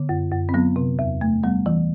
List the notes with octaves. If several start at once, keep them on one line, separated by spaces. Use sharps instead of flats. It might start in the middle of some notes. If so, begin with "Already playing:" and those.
Already playing: D3 B3
F#2
F#2
C4
F#3 B3
C3
E2
A3
G3 B3
E3